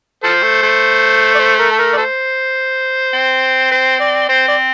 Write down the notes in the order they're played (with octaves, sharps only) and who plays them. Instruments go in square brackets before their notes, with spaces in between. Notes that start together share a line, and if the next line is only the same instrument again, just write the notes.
[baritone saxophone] F3 [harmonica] A4 C5
[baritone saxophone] A3
A3
[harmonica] D5
C5
A#4
A4
A#4
D5
A4 C5
[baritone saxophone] C4
[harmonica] C5
D5
[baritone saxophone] C4 [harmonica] C5
[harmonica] D5